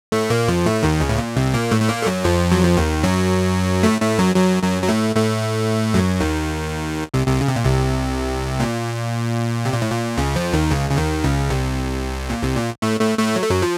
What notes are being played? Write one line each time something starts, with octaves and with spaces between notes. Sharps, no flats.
A2 A3
A#2 A#3
F2 F3
A2 A3
D#2 D#3
C#2 C#3
A2
A#2
C2 C3
A#2 A#3
A2 A3
A3
A#2 A#3
A3
F#2 F#3
F2 F3
F#3
F3
D#2 D#3
F#2 F#3
A2 A3
A2 A3
F#2 F#3
F#2 F#3
F#2 F#3
F#3
A2 A3
A2 A3
F#2 F#3
D#2 D#3
C2 C3
C2 C3
C#3
C3
A#2
C2 C3
A#2
C3
A#2
A2
A#2
C#2 C#3
F2 F3
D#2 D#3
C#2 C#3
C#3
D#2 D#3
C#2 C#3
C2 C3
A#2
C2 C3
A#2
A2 A3
A2 A3
A2 A3
F#3
A3
F#2 F#3
F3